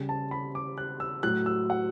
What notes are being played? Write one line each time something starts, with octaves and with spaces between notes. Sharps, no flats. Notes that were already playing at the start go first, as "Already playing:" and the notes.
Already playing: C#3 G3
A5
B5
D6
F#6
E6
A2 F#3 F#6
E6
F#5